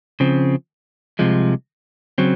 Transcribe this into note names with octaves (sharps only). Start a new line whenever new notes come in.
C#3 F3 C4
C2 C3 F3 G#3
C#3 F#3 C4